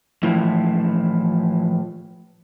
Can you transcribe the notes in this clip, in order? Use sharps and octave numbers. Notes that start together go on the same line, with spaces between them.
A2 E3 F3